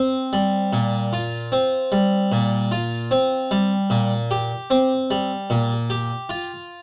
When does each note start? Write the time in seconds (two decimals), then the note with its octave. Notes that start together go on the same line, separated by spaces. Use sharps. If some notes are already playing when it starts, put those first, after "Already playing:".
Already playing: C4
0.33 G3
0.73 A#2
1.13 F4
1.52 C4
1.92 G3
2.32 A#2
2.72 F4
3.11 C4
3.51 G3
3.90 A#2
4.31 G4
4.70 C4
5.11 G3
5.50 A#2
5.90 G4
6.29 F4